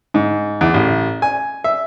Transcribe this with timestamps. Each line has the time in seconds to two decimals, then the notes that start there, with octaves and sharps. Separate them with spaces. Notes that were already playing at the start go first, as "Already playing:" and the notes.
0.14 G#2
0.61 E2
0.74 A1
1.22 G#5
1.64 E5